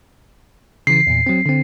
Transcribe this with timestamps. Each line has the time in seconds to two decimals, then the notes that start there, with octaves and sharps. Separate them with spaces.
0.87 C#3 E3 C7
1.07 E2 A#2
1.27 F#3 C4
1.46 D3 C4